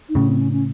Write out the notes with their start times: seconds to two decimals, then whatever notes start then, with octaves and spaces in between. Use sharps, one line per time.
0.09 D#4
0.15 A2 C#3 C#4
0.28 C4
0.40 C#4
0.52 C#4